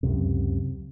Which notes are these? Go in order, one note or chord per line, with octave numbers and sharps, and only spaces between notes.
C#2 F#2 C3